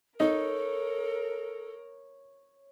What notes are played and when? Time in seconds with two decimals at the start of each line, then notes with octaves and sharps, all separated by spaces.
0.20 D#4 A4 A#4 C#5